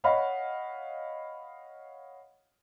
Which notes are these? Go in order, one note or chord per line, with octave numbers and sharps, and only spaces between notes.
C#5 D#5 F5 F#5 B5